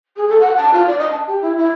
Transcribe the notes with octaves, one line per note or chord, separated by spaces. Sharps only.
G#4
A4
F#5
A5
F4
D5
D#5
A5
G4
E4
E4